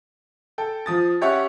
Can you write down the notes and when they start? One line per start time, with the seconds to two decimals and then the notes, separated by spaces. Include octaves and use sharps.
0.58 A4 G5
0.86 F3 D#6 A6
1.21 C#4 G4 C#5 E5 F#5